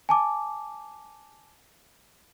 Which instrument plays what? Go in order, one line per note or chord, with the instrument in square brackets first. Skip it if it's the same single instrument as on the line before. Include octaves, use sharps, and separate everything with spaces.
[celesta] G#5 A5 D6